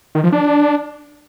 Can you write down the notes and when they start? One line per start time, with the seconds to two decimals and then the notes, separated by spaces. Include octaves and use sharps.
0.15 D#3
0.24 F3
0.32 D4